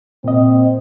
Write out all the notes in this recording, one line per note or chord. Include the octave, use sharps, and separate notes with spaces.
A#2 C4 D#5